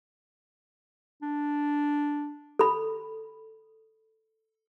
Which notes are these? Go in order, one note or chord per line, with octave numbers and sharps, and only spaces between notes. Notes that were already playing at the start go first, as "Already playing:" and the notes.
D4
A4 B5